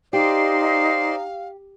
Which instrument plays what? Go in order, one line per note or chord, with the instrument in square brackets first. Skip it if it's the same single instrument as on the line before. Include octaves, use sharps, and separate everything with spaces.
[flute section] D#4 [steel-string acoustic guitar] G4 [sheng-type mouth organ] C5 D5 C6 [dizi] F5